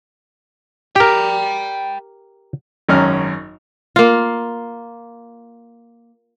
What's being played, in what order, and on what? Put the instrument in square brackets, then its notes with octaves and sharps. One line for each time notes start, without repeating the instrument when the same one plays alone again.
[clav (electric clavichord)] G4 A#4 [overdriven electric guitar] G5 B5
[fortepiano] G#1 F#2 C#4 A#5 F6
[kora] A#3 F4